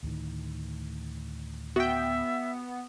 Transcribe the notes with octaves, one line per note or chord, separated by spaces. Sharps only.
D2 A2 D#3
B3 F#4 E5 G5